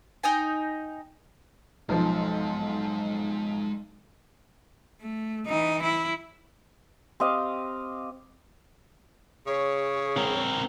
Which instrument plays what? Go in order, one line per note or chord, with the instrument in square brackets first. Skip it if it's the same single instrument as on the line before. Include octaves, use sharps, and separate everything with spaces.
[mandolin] D#4 D#5 G5 G#5
[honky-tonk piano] B1 F3 D#4 [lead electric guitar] G#3 C5
[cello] A3
E3 D#4
E4
[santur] C4 G4 D#5 F5
[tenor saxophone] C#3 [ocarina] G#4 [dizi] C#5
[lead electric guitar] C4 A#4